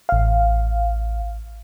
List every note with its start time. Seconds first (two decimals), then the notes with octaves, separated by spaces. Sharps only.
0.09 A1 F5